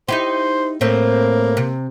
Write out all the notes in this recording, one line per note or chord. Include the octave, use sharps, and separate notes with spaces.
D#4 E4 G4 C5
A2 A#3 C4
C3